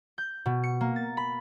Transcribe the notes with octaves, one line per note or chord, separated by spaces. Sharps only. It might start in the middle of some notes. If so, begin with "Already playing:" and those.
G6
B2
C#7
A#3
A6
B5